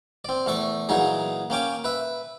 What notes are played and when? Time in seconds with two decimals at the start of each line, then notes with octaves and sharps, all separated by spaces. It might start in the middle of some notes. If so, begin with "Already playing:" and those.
0.25 C4 D5
0.46 E2 A3 A4 C#6
0.89 A#2 E3 F#3 D#4 G#4
1.50 A#3 C#4 G5 D6
1.84 B4 E5